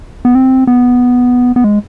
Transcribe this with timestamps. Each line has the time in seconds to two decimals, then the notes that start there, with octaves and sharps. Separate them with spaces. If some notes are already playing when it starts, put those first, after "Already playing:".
0.25 B3
0.35 C4
0.67 B3
1.56 B3
1.64 G#3